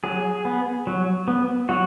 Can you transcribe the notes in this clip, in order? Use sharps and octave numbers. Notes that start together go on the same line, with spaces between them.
F#3 G#4
B3
F#3
B3
F#3 F#4